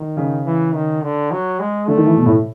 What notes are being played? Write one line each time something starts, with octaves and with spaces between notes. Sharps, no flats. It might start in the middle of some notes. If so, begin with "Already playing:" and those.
Already playing: D#3
C#3
E3
D#3
D3
F#3
G#3
D3 A3
D#3
E3
B2
A2